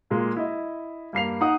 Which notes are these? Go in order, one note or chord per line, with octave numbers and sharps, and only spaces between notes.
A#2 G#3 A#3
E4 D#5
G2 A#3 C7 F7
D#4 F#5 D#6